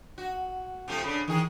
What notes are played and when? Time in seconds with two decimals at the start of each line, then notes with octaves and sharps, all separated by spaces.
0.18 F#4
0.88 C3 F3 A3
1.03 C#3 D4 B5
1.28 D#3 E3 G#4